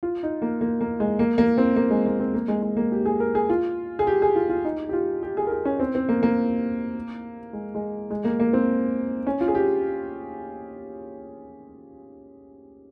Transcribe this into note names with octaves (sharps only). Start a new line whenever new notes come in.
F4
D#4
A#3
A#3
A#3
G#3
A#3
A#3
C4
A#3
G#3
A#3
C4
A#3
G#3
G#3
A#3
G4
G#4
A#4
G#4
F4
G#4
G4
G#4
F4
F4
D#4
G4
F4
G4
G#4
A#4
G#4
C#4
C4
C4
A#3
A#3
G#3
G#3
G#3
A#3
A#3
C4
C#4
F4
G#4
G4